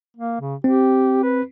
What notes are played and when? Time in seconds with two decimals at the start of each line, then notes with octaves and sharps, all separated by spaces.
0.17 A#3
0.41 C#3
0.64 C4 G4
1.23 B4